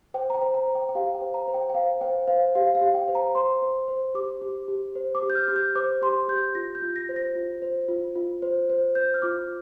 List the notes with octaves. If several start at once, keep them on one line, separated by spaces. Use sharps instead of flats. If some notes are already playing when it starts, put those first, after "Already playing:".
C5 G5
A#5
G5
C5
A#5
C5
G5
G5
G4 F5
G5
C5
A#5
C5
G5
G5
C5 F5
C5 G5
C5 F5
G4 F5
F5
G4
G5
C5
A#5
C5 C6
C5
C5
G4 D6
G4
G4
C5
D6
G4
G6
F6
G4
G6
C5 D6
G4 C6
G4 G6
F4 A#6
G6
F4
A#6
C5
A#6
F4
C5
F4
F4
C5
C5
C5 G6
F6
F4 D6